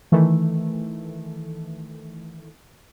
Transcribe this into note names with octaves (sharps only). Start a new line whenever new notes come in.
D#3 E3 A3